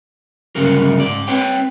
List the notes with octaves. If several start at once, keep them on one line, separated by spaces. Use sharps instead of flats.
D2 G2 C#3 F#3 A#4
G#2 D5
C4 B4 C#5 G5